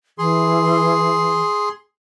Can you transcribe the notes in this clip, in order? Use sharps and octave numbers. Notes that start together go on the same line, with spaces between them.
E3 G#4 C6